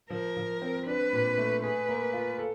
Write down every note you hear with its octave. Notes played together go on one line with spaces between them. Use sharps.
F3 A#4
F3
C4
D4 B4
A#2
A3
G#4 B4
A#3
F4
A4